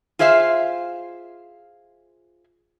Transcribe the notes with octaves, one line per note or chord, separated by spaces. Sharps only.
F4 G#4 C5 E5 F5